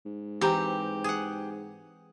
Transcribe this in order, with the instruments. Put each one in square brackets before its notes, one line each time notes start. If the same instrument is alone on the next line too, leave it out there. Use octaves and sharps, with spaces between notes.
[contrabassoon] G#2
[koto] E3 C4 [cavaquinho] G4 A#5
[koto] G#4 F#5